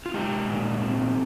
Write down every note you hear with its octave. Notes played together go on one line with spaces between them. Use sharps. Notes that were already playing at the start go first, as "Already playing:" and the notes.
F4
G#3 D#4 G4
A#2
C4